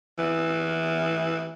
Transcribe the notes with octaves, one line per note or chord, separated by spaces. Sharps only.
E3